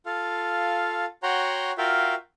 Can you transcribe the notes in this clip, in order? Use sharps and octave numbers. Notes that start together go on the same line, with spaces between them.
F4 A4 F5
F#4 C#5 F#5 G5 A#5 C6
F4 F#4 A#4 E5 F5 G5